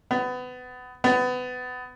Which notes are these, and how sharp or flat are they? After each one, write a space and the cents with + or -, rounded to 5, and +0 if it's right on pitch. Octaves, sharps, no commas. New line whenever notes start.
B3 +25
B3 +25